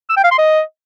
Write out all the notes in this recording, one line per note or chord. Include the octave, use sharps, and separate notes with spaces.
E6
G5
F5
C6
D#5